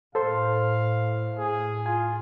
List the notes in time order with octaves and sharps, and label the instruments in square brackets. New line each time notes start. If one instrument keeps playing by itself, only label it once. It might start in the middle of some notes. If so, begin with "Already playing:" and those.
[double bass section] A2 [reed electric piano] A4 C5 C6 [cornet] F5
[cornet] G#4
[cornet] F4 [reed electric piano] G#5